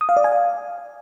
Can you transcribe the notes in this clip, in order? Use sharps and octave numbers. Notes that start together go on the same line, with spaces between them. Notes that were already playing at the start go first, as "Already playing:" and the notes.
D#6
F5
D5
G#5
F5